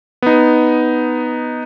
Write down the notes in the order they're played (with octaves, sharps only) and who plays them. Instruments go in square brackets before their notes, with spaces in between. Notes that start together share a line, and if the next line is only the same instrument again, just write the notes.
[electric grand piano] B3 D#4